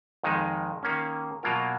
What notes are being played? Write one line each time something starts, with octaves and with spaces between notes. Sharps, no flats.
F2 D#3 G#3 D#4
D#3 A#3 C#4
B2 F#3 A#3 F4 A#4